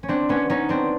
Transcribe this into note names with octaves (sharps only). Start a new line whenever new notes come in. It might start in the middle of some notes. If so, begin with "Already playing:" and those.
C#4
C4 D4
B3 C#4
C#4 D#4
C4 D4